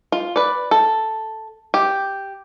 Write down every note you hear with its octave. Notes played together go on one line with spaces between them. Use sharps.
F4
B4 D5
A4
G4